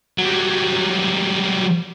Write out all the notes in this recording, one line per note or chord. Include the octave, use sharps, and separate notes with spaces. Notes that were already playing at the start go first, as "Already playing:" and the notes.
F#3 G3